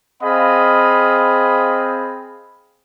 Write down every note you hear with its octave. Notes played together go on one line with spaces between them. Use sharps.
C4 G#4 D#5 F5 B5